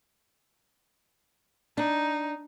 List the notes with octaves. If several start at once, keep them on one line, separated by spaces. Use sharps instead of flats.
D4 D#4